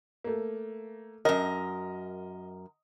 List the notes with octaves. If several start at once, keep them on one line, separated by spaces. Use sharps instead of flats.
A3 A#3
F#2 A#4 D#5